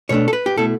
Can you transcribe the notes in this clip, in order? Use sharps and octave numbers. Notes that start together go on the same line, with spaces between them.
B2 A3 D4 C#5
A4
B4
G4
B2 A3 E4 A4